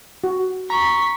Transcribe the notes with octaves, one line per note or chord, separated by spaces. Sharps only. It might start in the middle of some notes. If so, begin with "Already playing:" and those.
F#4
A#5 C#6 B6